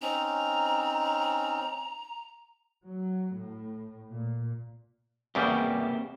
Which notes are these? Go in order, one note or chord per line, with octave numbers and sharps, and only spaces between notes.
C4 C#4 D#4 A#5
F#3
A2
A#2
E2 C#3 G3 A#3 C4 G4